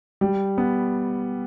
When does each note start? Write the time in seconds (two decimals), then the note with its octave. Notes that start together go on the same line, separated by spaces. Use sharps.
0.21 G3
0.58 B3